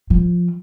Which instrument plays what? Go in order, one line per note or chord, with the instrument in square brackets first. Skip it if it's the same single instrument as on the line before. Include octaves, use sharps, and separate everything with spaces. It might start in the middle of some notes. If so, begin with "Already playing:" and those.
[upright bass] F3